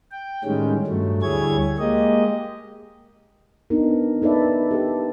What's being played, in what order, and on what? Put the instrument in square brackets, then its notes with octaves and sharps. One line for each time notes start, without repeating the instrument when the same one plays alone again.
[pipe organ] G5
A2 D#3 G3 G#3 C#4
G2 F#3 A3
D2 G3 E4 G#4 C#5 G#6
G#3 A#3 G4 D#5
[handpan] B3 D4 D#4 A#4
D#4 A4 B4 D5 E5
G4 A4